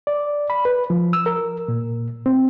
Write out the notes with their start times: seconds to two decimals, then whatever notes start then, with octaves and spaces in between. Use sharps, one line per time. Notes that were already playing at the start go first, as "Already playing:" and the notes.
0.07 D5
0.50 B5
0.65 B4
0.90 F3
1.13 E6
1.26 A#4
1.68 A#2
2.26 C4